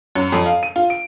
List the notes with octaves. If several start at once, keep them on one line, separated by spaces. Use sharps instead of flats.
F#2
F2
F5
D#7
F4
D7